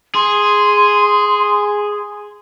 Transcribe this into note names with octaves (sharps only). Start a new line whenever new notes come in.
G#4 C6